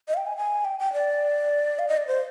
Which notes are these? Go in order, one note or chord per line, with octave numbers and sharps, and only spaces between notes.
D#5
F5
G5
G#5
G#5
G5
G5
D5
F5
D#5
D5
C5